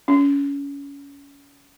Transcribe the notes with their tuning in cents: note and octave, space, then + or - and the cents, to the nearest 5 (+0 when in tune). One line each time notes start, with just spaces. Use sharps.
C#4 +25